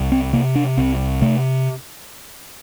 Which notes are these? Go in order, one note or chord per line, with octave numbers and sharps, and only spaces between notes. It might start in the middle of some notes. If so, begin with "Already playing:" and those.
Already playing: C2
C4
C3 A#3
D4
C2 C4
C3 A3